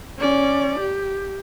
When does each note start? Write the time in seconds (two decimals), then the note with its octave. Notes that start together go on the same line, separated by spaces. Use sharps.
0.18 C#4 D5
0.79 G4